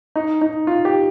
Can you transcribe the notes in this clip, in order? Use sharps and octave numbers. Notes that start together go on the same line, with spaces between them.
D#4
D#4
F4
G4